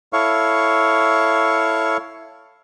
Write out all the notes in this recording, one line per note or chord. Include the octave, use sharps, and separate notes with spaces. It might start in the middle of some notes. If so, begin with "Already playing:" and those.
E4 A4 C#5 F5 C#6